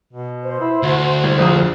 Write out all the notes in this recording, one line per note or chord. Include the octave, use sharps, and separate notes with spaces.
B2
C5
E4
D2 F#4
C2
A#1 F2 F4 D#6